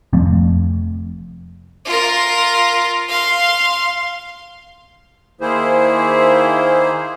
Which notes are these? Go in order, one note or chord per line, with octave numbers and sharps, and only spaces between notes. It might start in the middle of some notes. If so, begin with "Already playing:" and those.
F1 F3 A3 C4
F4 A#4
F5 C6
D#3 A#3 E4 G#4 C5